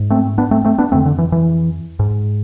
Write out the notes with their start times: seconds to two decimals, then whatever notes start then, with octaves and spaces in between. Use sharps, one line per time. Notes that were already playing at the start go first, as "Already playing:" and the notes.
Already playing: G#2
0.10 A3 C4
0.38 B3 D4
0.51 A3 C4
0.65 A3 C4
0.78 B3 D4
0.92 F2 D3 A3 C4
1.06 D3
1.18 E3
1.32 E3
1.99 G#2